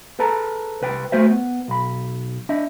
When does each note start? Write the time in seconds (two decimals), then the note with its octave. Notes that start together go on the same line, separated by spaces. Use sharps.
0.19 G#4 A4 B4 A5 A#5
0.82 C2 B4 G5
1.12 A3 F#4 C5 E5
1.30 B3
1.68 B1 B5
2.49 D4 D#5 E5